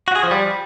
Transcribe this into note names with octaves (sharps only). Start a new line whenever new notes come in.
F#4
G#4
F3
G3